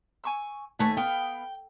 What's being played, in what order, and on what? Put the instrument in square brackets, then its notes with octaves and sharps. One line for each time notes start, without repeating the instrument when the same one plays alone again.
[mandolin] G#5 C#6 E6
[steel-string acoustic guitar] D#2 A3 G#5 [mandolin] B4 A5 C#6
[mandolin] B3 F5 [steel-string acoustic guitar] G5